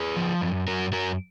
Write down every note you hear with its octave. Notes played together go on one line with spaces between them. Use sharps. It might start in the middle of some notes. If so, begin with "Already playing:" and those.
Already playing: G#4 B4
F3
F#2
F#2 F#4 A#4
F#2 F#4 A#4